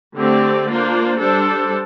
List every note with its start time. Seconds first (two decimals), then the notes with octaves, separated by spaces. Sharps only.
0.17 D3 A3 C4 G4 D5
0.68 A#3 D4 F4 C5
1.20 G3 D4 A4 C5